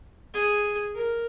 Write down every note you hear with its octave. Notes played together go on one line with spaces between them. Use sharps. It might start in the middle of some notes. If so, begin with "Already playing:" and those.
G#4
A#4